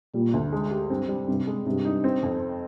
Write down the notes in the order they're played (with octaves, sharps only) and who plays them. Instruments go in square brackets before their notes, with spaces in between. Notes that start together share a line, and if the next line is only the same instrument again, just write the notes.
[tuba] A#2 [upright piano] G3
[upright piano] D2
G#3
G4
[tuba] G2 [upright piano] C4
[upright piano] G3
[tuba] G2 [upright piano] C3
[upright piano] G#3
[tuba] G2 [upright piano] C3
[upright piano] D#4
C4
F2